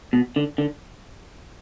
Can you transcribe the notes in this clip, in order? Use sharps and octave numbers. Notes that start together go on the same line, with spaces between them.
B2
D3
D3